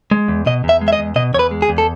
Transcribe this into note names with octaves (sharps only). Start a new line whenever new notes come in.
G#3
E2
B2 D#5
E2
E5
G#3
E5
D#5
E2
B2 D#5
E2 C#5
B4
G#3
G#4
E2
A4